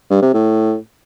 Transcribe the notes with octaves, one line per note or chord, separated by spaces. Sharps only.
G2
C3
A2